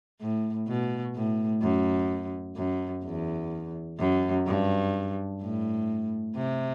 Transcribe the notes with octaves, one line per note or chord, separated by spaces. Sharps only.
A2
B2
A2
F#2
F#2
E2
F#2
G2
A2
C3